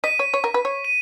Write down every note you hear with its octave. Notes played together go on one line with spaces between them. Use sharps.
D#5 B6 D#7
C#5
C#5
A#4
B4
C#5
D#7